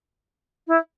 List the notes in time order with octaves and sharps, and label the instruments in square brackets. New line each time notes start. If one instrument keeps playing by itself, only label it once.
[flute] E4